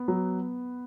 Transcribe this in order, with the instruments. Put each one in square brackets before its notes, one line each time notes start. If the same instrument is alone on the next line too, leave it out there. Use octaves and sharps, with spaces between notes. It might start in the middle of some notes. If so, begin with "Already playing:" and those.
Already playing: [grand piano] B3
[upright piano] F#3